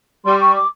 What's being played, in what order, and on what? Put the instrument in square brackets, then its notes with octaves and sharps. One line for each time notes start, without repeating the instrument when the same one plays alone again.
[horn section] G3 [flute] C6
[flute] C#6
D6